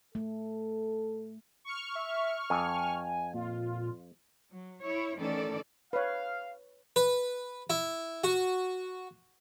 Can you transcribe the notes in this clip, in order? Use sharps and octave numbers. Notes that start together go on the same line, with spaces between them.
A3 A4
C#6 F6
E5
F2 G#5
A#2 F4
F#3
E4 C#5
D#3 E3 A3 C#4 A4 D5
B4 C#5 F5
B4
E4
F#4